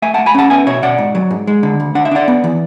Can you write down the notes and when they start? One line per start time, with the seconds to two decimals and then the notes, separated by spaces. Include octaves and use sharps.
0.02 A3 E5 G#5
0.14 F#5 A5
0.18 A3
0.26 G#5 B5
0.35 C#4 F#5 A5
0.50 B3 E5 G#5
0.67 B2 C#5 E5
0.82 B2 D5 F#5
0.98 G#2
1.15 F#3
1.31 G#2
1.47 G#3
1.63 D3
1.80 D2
1.95 D4 F#5
2.05 E5
2.11 D4 D5 F#5
2.28 B3
2.44 E3